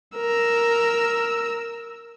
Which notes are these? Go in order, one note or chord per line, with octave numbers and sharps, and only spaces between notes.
A#4 E6